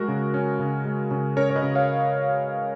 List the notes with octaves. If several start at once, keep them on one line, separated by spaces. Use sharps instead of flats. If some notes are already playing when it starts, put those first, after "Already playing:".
Already playing: G#3 F#4 A#4
C#3
C#4
C#3
G#3
C#3
C#4 A#4 C#5
C#5
B4 D#5
C#3
C#5 F5